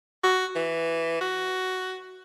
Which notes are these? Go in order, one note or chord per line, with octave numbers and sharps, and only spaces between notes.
F#4
E3
F#4